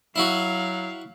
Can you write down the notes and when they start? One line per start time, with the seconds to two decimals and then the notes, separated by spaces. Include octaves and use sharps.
0.16 F#3 E4 F#4 F5